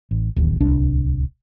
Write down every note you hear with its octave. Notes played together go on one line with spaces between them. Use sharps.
A1
D1 A1 D#2
D1 C2 D4